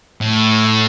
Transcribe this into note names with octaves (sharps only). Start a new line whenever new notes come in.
A2